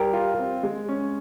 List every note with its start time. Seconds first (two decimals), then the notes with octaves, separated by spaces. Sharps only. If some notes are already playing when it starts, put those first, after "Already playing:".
Already playing: G3 G4 A#4
0.13 F4
0.39 C4
0.63 G#3
0.89 C#4